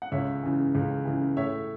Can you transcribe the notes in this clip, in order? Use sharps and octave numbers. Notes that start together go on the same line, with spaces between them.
F#5
C#2 C#5 E5
C#3 E3
C#2
C#3 E3
A2 C#5 E5